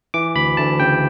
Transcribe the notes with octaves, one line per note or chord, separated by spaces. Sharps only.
E3 D6
D2 B5
D2 A5
C#3 G5